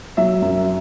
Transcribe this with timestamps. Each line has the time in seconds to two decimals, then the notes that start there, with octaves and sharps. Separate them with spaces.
0.17 F#3 E5
0.42 F#2